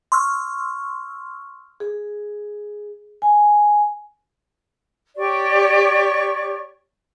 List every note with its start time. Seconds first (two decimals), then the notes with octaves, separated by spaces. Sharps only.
0.12 C6 C#6 E6 F6
1.80 G#4
3.22 G#5
5.17 G4 C#5 D5 C#6